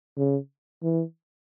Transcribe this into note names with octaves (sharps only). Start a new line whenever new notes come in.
C#3
E3